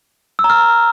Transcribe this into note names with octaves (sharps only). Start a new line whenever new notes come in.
E6
A#5
F6